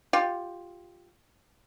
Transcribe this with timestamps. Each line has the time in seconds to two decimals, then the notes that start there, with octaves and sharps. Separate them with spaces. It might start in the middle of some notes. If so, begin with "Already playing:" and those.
0.13 F4 G4